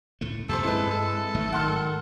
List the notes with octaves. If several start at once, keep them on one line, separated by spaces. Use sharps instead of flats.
C#2 A2 A3
F2 C3 A#3 A4 C5
G2 G#3 C4 E4 A4 B4
A4
G#1 G#2 F#3 A3
D#3 F#5 C6 F6